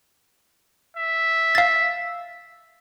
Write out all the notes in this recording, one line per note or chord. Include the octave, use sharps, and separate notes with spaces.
E5
F5 A6